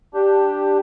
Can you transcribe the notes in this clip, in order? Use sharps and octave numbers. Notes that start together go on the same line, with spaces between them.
D4 G4